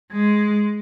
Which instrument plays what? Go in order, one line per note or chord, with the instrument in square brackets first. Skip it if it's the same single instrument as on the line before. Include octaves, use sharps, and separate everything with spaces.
[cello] G#3